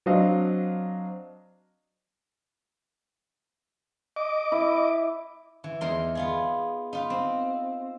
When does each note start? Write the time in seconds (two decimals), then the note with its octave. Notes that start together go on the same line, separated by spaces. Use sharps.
0.06 F#3 C4 D4 D#5 F5
4.16 D#5 D6
4.52 E4
5.64 E3
5.81 E2 D#4 A#4 C6
6.15 B3 F4 G#4
6.93 D#4 F4 B4
7.10 C4